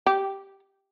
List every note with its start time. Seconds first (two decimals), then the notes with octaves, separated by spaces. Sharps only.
0.06 G4